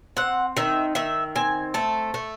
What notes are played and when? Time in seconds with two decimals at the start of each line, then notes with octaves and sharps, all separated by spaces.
0.17 C4 F#5
0.57 D#3 E5
0.95 D#3 E5
1.36 C4 G#5
1.74 A3 A5
2.14 A3